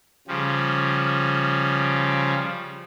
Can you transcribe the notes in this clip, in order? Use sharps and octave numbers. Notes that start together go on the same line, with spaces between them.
C#3 F3 G3